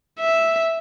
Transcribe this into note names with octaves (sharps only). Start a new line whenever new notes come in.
E5